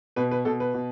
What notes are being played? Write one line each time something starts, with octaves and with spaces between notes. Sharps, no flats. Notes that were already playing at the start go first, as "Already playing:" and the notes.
B2 B4
B4
B2 A4
B4
B2